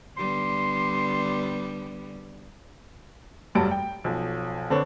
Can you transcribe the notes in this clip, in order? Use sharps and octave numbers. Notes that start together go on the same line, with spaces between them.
D3 G3 B3 C6
F1 G2 F#3 G3 A5 D7
G5
B1 F3
D3 C4 D4 B4 C#5